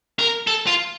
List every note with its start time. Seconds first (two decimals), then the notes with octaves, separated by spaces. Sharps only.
0.19 A#4
0.47 A4
0.67 F4